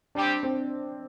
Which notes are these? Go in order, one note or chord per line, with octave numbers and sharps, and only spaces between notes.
G3 C4 D4 G4
C4